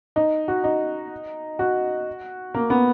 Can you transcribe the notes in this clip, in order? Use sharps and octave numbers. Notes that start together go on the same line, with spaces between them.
D#4
F#4
D#4
F#4
A#3
B3